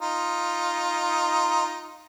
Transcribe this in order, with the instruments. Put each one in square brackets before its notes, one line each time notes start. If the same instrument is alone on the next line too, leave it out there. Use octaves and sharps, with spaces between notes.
[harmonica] D#4 F4